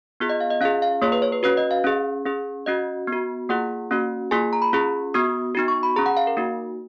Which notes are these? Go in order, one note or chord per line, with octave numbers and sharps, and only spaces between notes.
B3 F4 G#4
D#5
F5
D#5
C#4 F4 G#4 F5
F5
A#3 F4 G#4 C#5
B4
C#5
B4
C#4 F#4 B4
D#5
F5
C#4 G#4
C#4 G#4
C#4 F#4 D#5
B3
F#4
A#3 F4 G#4 F#5
A#3 C#4 F#4
A#3 F4 G#4 G#5
A#5
B5
C#4 F4 G#4
B3 F#4 D#6
B3 D#4 F#4
C#6
B5
C#4 G#4 A#5
F#5
F5
A#4
A#3 D#4 F#4